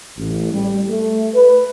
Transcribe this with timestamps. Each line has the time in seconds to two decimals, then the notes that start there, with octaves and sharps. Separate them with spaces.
0.18 A1
0.52 G3
0.89 A3
1.34 B4